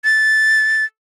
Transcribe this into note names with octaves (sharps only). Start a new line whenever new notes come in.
A6